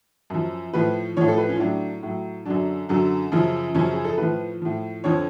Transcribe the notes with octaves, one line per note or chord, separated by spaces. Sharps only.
F#2 F3
A2 F3 B4
A2 F3 C#5
A4
B4
C#4
F4
A2 F#3 D4
A2 F#3
F#2 D3 F#3 D4
F#2 D3 F#3
F#2 C#3 F3
F#2 C#3 F3 C#4
G#4
A4
A2 F3 B4
A2 F3
F2 D3 F3 C#5